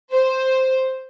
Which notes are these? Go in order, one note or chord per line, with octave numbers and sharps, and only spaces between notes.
C5